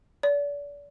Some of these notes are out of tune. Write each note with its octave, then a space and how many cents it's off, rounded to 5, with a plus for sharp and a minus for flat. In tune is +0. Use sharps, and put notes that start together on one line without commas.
D5 -35